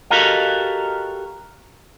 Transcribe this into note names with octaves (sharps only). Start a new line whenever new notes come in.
F#4 G4 A4 A#4 D#5 F5